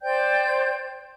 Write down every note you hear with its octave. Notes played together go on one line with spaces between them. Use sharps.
C5 D5 G5 G6